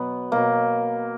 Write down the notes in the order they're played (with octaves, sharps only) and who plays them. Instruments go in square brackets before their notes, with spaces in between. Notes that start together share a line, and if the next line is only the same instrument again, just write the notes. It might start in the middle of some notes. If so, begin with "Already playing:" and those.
Already playing: [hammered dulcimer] B2 F#3 B3
B2 F#3 A#3